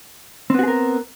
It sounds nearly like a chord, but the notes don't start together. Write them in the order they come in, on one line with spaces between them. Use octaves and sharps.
C4 B3 F#4 G#4 A#4